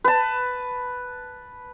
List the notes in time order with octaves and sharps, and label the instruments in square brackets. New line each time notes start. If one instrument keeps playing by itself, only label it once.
[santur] B4 A5